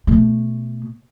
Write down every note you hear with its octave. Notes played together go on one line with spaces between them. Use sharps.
B2 A3